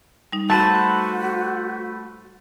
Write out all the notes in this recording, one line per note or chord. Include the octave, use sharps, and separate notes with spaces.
G3 D#4
A3 F#4 B4 C5 A5